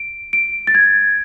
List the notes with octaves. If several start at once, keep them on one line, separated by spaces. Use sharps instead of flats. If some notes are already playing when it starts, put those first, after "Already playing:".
Already playing: D7
D7
A6
G#6